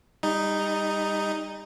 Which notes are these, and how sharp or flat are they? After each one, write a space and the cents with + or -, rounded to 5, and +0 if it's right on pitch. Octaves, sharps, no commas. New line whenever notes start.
G3 +30 D#4 +0